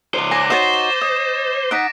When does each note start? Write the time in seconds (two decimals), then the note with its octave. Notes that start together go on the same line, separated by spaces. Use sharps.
0.14 C#2 C5
0.31 G#5 D6 A#6 C7
0.50 D#4 F#4 C5 C#5 A6 D#7 E7
1.01 D#5
1.71 D#4 F#5 A#6 B6 D7